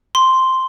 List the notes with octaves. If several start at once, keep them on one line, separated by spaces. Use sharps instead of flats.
C6